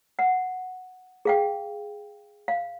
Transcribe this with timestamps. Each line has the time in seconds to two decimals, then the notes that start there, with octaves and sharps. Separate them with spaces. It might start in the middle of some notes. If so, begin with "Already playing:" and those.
0.19 F#5
1.25 G#4 F5 G5
2.48 F5